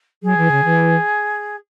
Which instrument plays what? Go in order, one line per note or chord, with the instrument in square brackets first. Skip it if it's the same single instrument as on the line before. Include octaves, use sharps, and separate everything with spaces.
[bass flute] F#3 [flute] G#4
[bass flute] E3
C#3
E3